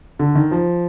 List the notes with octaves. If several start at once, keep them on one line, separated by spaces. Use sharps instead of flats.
D3
D#3
F3